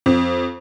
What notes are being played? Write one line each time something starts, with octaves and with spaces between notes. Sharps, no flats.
F2